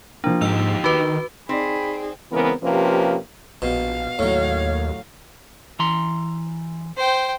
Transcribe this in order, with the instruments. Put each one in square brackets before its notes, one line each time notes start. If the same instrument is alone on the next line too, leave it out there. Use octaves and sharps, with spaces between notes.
[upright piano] F3 A#3 [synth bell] D4
[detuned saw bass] G#2 [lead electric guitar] D#4 G4 [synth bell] E6
[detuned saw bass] D#3 [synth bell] F#4 B4 [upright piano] D6
[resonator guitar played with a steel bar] C4 [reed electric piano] D#4 D5 [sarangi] G#4 [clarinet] B5
[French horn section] C#3 E3 G#3 B3 C4 A#4
C3 F3 A#3 C#4 G4 B4
[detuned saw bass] A#1 [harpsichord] B2 [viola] F5
[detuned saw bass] D#2 [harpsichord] A2 F#3 [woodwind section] C#5
[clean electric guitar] E3 A#5 C6
[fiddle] C5 G5